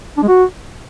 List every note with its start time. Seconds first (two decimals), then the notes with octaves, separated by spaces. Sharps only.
0.17 D4
0.23 G#3
0.28 F#4